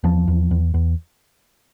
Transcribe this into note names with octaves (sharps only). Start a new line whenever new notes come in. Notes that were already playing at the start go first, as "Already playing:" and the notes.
E2 F3
E2
E2
E2